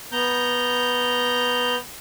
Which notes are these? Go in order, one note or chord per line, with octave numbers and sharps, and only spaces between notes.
B3 A#5 G6